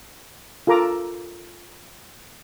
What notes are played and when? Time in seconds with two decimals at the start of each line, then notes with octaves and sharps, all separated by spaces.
0.67 F4 A4 A#4 A#5 D6